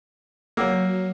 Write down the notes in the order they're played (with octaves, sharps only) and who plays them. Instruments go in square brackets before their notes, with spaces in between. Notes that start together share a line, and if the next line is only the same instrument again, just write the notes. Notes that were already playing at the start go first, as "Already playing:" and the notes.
[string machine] F#3 [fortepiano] A#3 [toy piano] C#5 F#5 E6